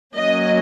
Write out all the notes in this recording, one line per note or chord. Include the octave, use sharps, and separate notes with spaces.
F#3 A#3 C#4 D#5